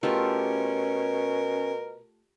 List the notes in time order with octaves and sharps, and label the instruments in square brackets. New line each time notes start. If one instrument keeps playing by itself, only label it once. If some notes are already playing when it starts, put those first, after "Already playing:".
[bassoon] B2 [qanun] A3 F4 G4 [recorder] C#4 [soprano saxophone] A#4